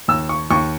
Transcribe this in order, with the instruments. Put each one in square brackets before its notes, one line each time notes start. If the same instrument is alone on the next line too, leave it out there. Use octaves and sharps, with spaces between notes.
[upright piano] D#2 E6
C#6
D#2 C#6